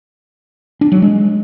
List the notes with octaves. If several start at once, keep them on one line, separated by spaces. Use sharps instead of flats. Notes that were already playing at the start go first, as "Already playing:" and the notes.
D4
F#3
G#3